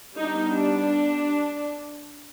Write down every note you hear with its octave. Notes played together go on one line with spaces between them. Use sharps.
G3 B3 D4 D#4
D4